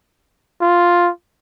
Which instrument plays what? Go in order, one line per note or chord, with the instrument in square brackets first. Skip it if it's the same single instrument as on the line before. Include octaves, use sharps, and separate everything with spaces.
[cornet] F4